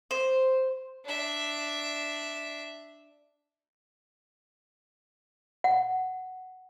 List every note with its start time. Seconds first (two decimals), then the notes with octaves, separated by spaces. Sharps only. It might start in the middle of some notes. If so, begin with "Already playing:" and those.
0.11 C5
1.05 D4 E5
5.64 F#5